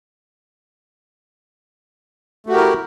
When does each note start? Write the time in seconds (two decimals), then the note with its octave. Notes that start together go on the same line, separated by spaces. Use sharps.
2.47 A3
2.49 F#4
2.52 G4
2.55 A#4
2.58 E4